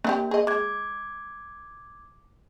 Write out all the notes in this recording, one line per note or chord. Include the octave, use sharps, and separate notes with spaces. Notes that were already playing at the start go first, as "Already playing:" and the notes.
A#3 D4 E4 G4
G#4 D#5
G#3 D6 G#6